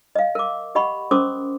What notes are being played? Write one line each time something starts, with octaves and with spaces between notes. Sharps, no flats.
D#5 F5
A#4 D6
G4 D#5 F#5 B5 C#6
C#4 A#4 C5 C6 D6 D#6